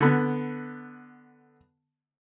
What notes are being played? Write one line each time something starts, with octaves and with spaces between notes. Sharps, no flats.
D3 B3